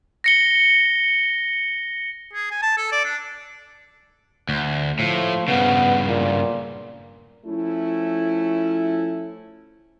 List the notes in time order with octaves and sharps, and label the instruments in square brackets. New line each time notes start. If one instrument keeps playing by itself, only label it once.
[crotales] A#6 C#7 G7
[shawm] G#4
G#5
A5
A4
D5
D4
[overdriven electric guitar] D2
[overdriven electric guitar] A2 [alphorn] F3
[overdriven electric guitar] G2 C#3 [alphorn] B3
[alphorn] A#2
[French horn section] F3 A3 C#4 E4